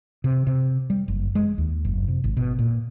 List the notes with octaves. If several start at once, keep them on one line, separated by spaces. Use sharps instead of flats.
C3
C3
G3
F#1
G#3
D#2
F#1
C3
G#1
B2
A#2